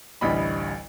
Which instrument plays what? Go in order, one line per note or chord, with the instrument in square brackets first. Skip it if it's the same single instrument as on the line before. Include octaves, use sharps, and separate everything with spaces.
[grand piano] A1 D2 G3 D#5 B5